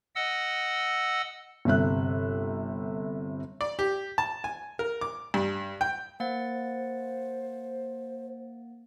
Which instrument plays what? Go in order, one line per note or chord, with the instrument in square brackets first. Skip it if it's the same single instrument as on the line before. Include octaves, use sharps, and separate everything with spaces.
[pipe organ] D#5 F#5 E6
[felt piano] G1 C3 E5 F#6
[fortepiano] D5
G4
A5
G#5
A#4
D6
G2
G5
[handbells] A#3 F#5 A6 [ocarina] C5